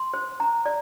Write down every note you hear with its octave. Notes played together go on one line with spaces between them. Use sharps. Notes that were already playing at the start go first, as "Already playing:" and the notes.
Already playing: C6
C5
A#5
D5